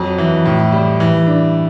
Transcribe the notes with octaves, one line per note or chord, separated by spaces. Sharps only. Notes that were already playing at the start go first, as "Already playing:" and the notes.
Already playing: F2 F#3
E3
A2
G3
E3
D4